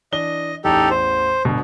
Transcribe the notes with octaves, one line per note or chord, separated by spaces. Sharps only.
E3 D4 D#5 G7
A1 E2 D#4 G4 A4
C5
G1 B2